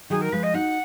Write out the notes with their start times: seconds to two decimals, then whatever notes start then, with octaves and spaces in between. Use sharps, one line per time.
0.10 D#3 F#3 G#4
0.21 A#4
0.32 F3 G#3 B4
0.43 D#5
0.54 D#4 F#4 F#5